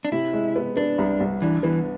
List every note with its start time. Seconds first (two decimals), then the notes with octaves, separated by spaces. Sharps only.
0.05 D4
0.12 C3 E4
0.33 G#3
0.56 B3
0.76 B3 D4
0.98 C2
1.20 C2
1.42 E3 D4
1.63 E3 B3